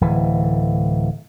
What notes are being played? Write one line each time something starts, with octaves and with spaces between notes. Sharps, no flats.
D1 E3